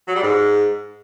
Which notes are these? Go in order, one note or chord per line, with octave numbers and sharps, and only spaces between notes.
F#3
G3
G#2